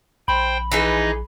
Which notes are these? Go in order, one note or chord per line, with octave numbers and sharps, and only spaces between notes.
A#1 C5 G5 B5 C6
E3 D#4 G#4 B4 D#5